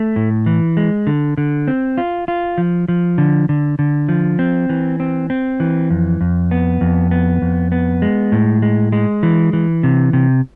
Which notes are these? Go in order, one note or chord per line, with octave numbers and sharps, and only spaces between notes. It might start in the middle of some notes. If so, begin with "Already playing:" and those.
Already playing: A3
A2
E3
G#3
D3
D3
C4
F4
F4
F3
F3
D3
D3
D3
F3
C4
E3
C4
C4
E3
F2
F2
B3
F2
B3
F2
B3
G#3
A2
G#3
G#3
E3
E3
C3
C3